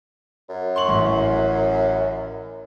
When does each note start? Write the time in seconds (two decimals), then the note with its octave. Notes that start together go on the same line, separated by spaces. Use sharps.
0.49 F#2
0.76 C6 C#6 F#7
0.88 A1